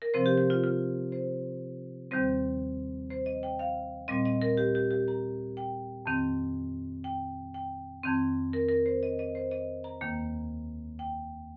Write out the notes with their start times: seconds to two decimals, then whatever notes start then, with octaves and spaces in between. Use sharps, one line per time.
0.02 A#4
0.14 C3 F3 C4 C5
0.26 G4
0.38 G4
0.50 F4
0.64 F4
1.12 C5
2.11 D#2 D#3 G3 C4 C5
3.10 C5
3.26 D#5
3.43 G5
3.59 F5
4.08 A#2 G3 C4 D#5
4.25 D#5
4.42 A#4
4.57 G4
4.75 G4
4.91 G4
5.08 A#5
5.57 G5
6.06 F2 D#3 C4
7.04 G5
7.54 G5
8.03 F2 D#3 C4
8.53 A#4
8.69 A#4
8.86 C5
9.03 D#5
9.19 D#5
9.35 C5
9.51 D#5
9.84 A#5
10.01 D#2 D#3 A#3
10.99 G5